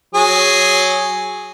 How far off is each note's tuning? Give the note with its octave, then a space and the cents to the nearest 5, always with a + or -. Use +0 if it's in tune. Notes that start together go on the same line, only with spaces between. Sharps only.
F#3 +0 G#4 +0